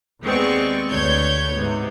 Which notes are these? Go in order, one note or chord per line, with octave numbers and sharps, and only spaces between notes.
D#2 G#3 B3 C4 D5 C#6
D2 D4 B4 C#5 G6 G#6
G#2 C3 B3